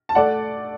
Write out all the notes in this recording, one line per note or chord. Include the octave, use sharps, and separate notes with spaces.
A5
A3 D5 F#5